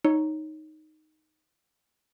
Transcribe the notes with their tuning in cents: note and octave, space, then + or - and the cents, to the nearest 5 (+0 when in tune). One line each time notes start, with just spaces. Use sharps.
D#4 +0 C#5 +0